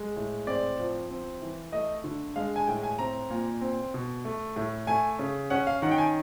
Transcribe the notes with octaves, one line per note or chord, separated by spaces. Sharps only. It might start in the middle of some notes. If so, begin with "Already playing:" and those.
Already playing: G#3
A2
C4 D5
F3
C4
E3
A3 D#5
D3
G#3 F5
G#5
A2 G5
G#5
C4 A#5
A#2
C4
B2
A3
A2
A3 G#5
C#3
C#4 F#5
F5
D#3 F#5
G5
G#5